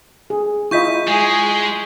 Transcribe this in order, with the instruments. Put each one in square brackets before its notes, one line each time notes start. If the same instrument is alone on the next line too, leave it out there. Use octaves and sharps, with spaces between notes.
[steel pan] G#4
[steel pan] E4 F4 D#5 [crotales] C#6 G6 B6
[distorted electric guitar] G#3 [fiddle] G#4